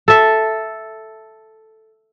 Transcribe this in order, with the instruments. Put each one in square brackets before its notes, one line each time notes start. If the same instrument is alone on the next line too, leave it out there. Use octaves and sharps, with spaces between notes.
[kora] A4 E5